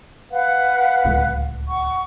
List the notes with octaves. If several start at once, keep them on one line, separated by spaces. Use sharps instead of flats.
B4 F5 F#5
D1 C#2
F#5 C#6